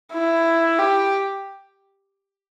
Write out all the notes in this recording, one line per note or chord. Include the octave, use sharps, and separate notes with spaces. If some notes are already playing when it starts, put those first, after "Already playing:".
E4
G4